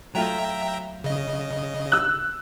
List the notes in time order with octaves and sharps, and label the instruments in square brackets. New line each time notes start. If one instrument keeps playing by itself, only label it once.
[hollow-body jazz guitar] F#3 A3 F4 [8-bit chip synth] E5 G5 A#5
[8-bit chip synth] C#3 D#5
[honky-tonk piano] E6 F#6